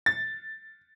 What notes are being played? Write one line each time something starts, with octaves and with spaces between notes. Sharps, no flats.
A6